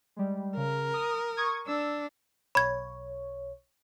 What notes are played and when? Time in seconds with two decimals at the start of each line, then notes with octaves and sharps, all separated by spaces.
0.16 G3 G#3
0.57 C#3 A#4
0.94 D#6
1.37 C#6 D#6 G#6
1.67 D4 E6
2.55 B1 C#5 B5 G#6